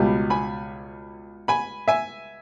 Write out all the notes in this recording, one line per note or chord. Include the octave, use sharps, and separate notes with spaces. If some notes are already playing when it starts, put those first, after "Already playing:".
Already playing: C#2 B2 G3 G#5 B5
G#5 B5
G#5 B5
E5 G#5